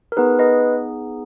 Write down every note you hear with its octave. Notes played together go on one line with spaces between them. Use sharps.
A#4
B3 D#4 G#4 B4
B4 D#5